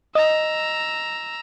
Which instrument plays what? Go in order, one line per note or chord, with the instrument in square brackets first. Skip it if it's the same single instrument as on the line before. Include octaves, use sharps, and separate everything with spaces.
[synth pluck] D#5 [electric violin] A#5 E6